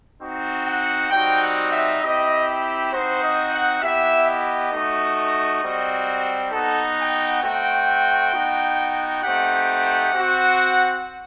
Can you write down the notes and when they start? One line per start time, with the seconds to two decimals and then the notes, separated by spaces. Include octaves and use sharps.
0.21 C4 D#4 F#4
0.66 F#5
1.10 G3 C4 D#4 F#4 G5
1.41 F#5
1.71 E5
2.01 C4 E4 G4 D#5
2.91 C4 D#4 F#4 C5
3.21 D#5
3.52 F#5
3.81 B3 E4 G4 E5
4.26 D#5
4.72 A3 D#4 F#4
5.62 G3 C4 F#4
6.52 B3 D#4 F#4 A4
6.98 G5
7.43 A3 C4 F#4 G5
8.33 B3 D#4 F#4
9.23 A3 C4 D#4 G4 F#5
10.13 C4 F#4